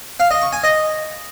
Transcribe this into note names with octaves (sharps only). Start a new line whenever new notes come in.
F5
D#5
C#6
G#5
D#5